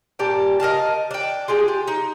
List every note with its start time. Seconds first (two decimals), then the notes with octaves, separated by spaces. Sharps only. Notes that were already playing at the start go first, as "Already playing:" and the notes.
0.19 A#2 G4 D5 A5
0.60 A#4 D#5 F5 A5
1.11 D4 G5
1.48 F4 G4 G#4
1.68 G4
1.88 D#4